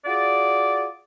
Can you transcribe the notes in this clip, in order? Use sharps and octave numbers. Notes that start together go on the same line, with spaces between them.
F4 F#4 G#4 D5